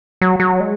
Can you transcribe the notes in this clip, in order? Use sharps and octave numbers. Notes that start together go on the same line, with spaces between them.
F#3
F#3
G#3